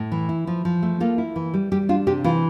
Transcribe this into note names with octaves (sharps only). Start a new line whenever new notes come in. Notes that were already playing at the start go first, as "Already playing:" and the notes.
Already playing: A2
E3
E4
F3
F3
A3
A#3 F4 A4
E4
E3
G3
G3 G4
D4 F4
C3 G4
E3 F4